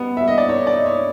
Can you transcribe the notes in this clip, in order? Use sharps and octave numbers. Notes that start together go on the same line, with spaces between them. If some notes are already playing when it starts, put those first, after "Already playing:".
Already playing: G3 B3 D#4
G3 E5
D#5
D5
D#4 C#5
D5
D#4
C#5